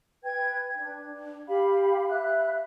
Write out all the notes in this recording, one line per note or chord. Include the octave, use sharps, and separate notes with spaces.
B4 G5 G#6
D4
G4 F5 B5
E5 F#6